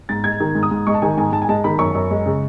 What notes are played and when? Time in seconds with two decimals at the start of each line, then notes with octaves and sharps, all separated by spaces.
0.09 G#2 A6
0.24 G#3 G#6
0.40 D#3
0.55 G#2
0.63 D#6
0.71 G#2
0.87 G#3 C#6
0.94 A5
1.02 D#3 G#5
1.18 G#2 G#5
1.32 G#2 A5
1.42 G#5
1.49 G#3 A5
1.64 D#3 B5
1.79 F#2 C#6
1.95 F#2
2.11 G#3
2.26 C#3